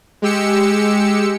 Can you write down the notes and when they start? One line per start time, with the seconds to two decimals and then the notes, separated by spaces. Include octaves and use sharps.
0.22 G#3 G4 E6 C#7